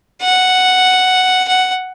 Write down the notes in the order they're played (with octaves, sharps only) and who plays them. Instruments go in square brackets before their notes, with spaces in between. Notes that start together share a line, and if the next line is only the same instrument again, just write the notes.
[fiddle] F#5
F#5